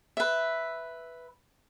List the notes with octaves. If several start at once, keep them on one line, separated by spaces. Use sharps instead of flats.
B4 E5